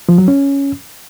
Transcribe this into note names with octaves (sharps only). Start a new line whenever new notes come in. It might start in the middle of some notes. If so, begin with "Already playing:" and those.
F3
F#3
C#4